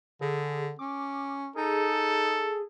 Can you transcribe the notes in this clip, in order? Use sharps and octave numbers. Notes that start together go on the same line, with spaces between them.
D3 G#4
C#4 D6
D#4 G#4 A4